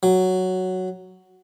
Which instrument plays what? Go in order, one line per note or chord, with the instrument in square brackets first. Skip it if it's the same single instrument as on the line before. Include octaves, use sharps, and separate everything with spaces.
[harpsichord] F#3